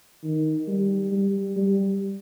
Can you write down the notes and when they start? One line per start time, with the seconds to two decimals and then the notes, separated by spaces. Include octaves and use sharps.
0.24 D#3
0.68 G3
1.12 G3
1.57 G3